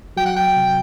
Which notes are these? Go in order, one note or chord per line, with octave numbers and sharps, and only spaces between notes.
F#3 G5
F#5
G5
C3